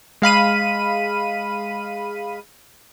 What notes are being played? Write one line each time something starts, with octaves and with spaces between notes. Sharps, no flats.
G#3 F5 B5 D#7